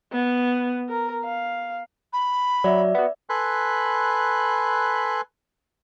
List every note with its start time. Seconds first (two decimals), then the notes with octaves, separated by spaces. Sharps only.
0.12 B3
0.89 A#4
1.24 F5
2.13 B5
2.64 F#3 D5 E5
2.95 B3 F#4
3.30 A4 B4 G#5 B5 C6 F#6